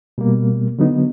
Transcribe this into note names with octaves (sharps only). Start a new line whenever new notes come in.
B2 G3 A#3
D3 F#3 B3 D#4